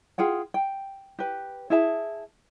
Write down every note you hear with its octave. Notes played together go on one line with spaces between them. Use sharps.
F4 G#4 F#5 G5
G5
G4 B4
E4 G#4 E5 A5